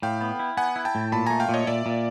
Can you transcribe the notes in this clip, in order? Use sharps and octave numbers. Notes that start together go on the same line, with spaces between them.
A2 F5 G5
B3
E4
B3 F#5 G#5
E4
G5 A5
A2
A#2 A5 B5
A3 G#5 A#5
F5 G5
A#2 C#5 D#5
A#2 D5 E5
A#2